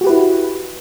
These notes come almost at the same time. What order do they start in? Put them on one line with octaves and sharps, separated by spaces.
F#4 G4 B4 E4